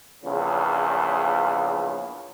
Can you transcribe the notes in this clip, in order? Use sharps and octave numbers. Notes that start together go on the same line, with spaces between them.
A#1 E2 C#3